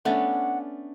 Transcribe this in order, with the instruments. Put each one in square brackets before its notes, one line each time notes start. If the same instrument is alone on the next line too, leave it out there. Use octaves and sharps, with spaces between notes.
[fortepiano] A3 [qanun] B3 C#4 D4 [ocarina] F#5